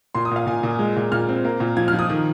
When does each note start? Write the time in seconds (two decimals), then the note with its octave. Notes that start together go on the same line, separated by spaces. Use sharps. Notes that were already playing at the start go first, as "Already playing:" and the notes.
0.15 A#2 C6
0.25 D#6
0.31 A#2 F5
0.46 A#2 G#5
0.63 A#2
0.79 G#3
0.96 A#2
1.12 A#2 F6
1.29 C4
1.45 A#3
1.60 A#2
1.77 F3 G#6
1.88 F6
1.93 F3
1.99 D#6
2.10 D#3